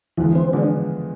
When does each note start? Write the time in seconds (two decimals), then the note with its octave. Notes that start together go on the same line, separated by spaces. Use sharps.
0.17 E2 D3 E3 F3 G#3 B3
0.35 C4
0.53 D3 F3 G#3 B3 D4